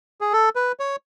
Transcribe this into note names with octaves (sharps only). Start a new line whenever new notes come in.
G#4
A4
B4
C#5